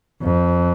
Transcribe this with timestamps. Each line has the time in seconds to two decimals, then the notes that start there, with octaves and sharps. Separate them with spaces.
0.23 F2